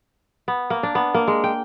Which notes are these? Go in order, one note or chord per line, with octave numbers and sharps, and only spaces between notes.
B3
A#3
D4
B3
A#3
G#3
G5